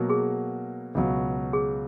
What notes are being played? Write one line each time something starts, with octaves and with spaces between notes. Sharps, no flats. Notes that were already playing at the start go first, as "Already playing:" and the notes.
Already playing: B2 F#3 A#3
G#4
C#2 B2 F#3
G#4